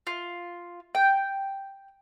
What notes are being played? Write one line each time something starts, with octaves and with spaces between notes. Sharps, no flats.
F4
G5